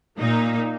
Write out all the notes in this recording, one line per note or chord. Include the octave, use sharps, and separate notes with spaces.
A#2 A#3 D#4